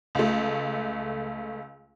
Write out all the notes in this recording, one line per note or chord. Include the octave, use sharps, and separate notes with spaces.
C#2 A3